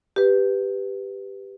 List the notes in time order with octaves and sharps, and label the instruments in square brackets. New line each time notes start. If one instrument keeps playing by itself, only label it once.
[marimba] G4 B4